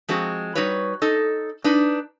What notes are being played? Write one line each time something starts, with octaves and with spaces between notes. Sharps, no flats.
F3 G#3 C4 F#4
G3 D#4 F#4 B4 C#5
D#4 A4 D#5
D4 D#4 B4